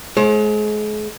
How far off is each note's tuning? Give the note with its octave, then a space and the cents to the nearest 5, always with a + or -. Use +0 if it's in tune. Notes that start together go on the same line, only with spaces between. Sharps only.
G#3 +35 C5 +40